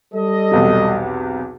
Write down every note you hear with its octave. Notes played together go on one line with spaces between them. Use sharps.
G3 A4 D#5
B1 E2 C3